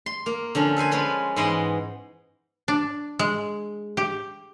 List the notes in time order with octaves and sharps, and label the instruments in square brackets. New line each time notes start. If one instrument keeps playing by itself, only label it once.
[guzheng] C6
A#3
D3 F3 C#4
A4 B4 C5 G#5
G#3 C#4 B4 B5 C6
G#2 E3 B3 D#5 B5 C6
[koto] D4
G#3
G4